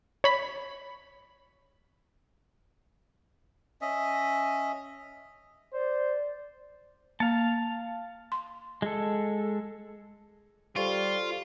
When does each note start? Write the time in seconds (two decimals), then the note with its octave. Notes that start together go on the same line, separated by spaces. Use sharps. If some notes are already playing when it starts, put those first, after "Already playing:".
0.24 C#5 B5 B6
3.81 C#4 D#5 E5
5.73 C5 D5
7.20 A#3 F5 A5
8.32 C6
8.82 G#3 A4
10.76 G3 F4 A4 C5 C#6